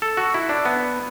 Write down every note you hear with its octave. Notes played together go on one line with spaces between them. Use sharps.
A4
F#4
E4
D4
B3